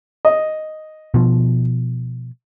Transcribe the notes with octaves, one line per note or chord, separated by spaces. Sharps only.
D#5
B2 F3